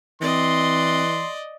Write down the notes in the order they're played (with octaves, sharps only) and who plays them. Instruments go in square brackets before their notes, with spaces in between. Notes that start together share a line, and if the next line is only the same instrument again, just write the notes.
[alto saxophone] E3 [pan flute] C4 [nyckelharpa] D5 D#5 [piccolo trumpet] C6